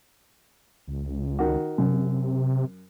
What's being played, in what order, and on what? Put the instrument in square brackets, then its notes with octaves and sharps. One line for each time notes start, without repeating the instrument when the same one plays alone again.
[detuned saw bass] C#2
[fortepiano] D#3 F#4
[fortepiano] F#2 [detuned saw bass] C3